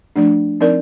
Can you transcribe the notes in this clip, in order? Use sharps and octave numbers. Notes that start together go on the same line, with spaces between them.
F3 A3 D4
F3 C4 D#4 A#4 D5